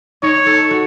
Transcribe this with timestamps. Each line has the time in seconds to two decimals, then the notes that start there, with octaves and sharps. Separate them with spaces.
0.23 D#4 C#5
0.46 A4
0.71 F#4